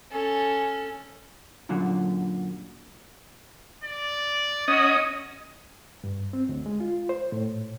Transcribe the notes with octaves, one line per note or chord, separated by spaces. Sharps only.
C#4 A4
F#2 A#2 D3 F#3
D5
C#4 F#4 D#5 D#6
G2
C4
D2
G#3
F4
C5
A2